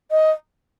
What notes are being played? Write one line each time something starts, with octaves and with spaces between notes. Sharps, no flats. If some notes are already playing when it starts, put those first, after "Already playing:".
D#5